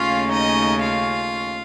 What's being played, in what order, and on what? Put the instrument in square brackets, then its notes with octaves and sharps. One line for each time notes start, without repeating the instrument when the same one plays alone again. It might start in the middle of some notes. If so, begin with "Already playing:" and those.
Already playing: [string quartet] D#2 C#3 A3 C#4 F4 F5
D#4 D#5
F4 F5